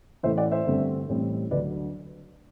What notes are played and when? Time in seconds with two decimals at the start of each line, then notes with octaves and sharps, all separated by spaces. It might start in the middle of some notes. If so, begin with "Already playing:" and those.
0.23 A1 A2 E3 A3 C5 E5
0.38 D5 F#5
0.51 C5 E5
0.66 G1 G2 D3 A3 C4
1.09 A1 A2 G3 C4
1.51 D2 D3 F#3 B4 D5